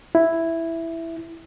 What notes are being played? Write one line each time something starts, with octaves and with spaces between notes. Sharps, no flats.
E4